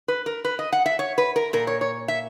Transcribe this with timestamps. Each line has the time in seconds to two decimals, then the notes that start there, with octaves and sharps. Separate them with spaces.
0.08 B4
0.26 A#4
0.45 B4
0.59 D#5
0.72 F#5
0.86 E5
0.99 C#5
1.18 B4
1.36 A#4
1.53 A#2 A#4
1.67 C#5
1.81 C#5
2.08 E5